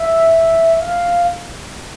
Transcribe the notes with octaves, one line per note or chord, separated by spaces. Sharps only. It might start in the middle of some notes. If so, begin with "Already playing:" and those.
Already playing: E5
F5